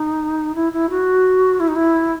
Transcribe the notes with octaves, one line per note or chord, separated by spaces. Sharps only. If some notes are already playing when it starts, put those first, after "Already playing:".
Already playing: D#4
E4
E4
F#4
E4
D#4
E4